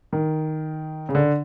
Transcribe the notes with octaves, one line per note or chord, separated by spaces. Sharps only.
D#3
C#3
D3